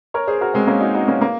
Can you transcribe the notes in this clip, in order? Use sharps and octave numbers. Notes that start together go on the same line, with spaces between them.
A#4 C#5
G#4 C5
F#4 A#4
G#3 C4
A#3 C#4
D#4 F#4
D#4 F#4
A#3 C#4
A#3